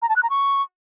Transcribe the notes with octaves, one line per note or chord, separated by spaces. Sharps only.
A#5
A5
F#6
A#5
C#6